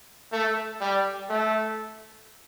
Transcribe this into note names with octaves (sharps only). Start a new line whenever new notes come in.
A3
G3
A3